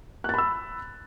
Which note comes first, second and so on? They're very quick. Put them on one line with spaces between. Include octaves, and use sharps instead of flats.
F#6 A6 B5 E6